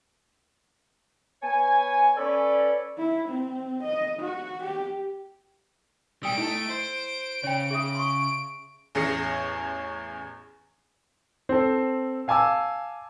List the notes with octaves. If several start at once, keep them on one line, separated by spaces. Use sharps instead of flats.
B3 C#5 G#5
C#4 A4 B4 C#5 D5
E4
C4
D#5
F#4
G4
B2 G3 G5 D#6 E6 D7
A3 E4 D#5 A5
C5
C#3 C#5 G5
G#4 E5 D#6
C6 C#6
A1 E2 C#4 G#4 A#6 C#7
C4 A4
F5 G#5 A5 D6 E6